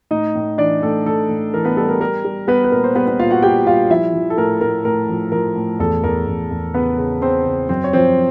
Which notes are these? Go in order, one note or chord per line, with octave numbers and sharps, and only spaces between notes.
A2 D#4 D#5
A2
E3 D4 D5
A2 A4
A2 A4
A2
E3 A#4
B3 B4
G3 A4
A#4
G3 A#4
G3
G3 B3 B4
B4
A#2 A#4
C5
G3 B3 B4
B3 B4
A#2 F4 F5
F#4 F#5
G3 G4 G5
G3 F4 F5
F3 E4 E5
F3
A4
A2 A#4
A2 A#4
A2 A#4
F3
F3 A#4
A2
E2 A4
E2 A#4
E2
E2
C#3 B3 B4
C#3
C#3 C4 C5
C#3
F#2 C4 C5
C#5
F3 C4 C5